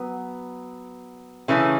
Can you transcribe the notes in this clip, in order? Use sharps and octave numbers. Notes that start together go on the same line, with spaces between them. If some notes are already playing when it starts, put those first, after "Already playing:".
Already playing: F#3 B3
C#3 E3 A3 C#4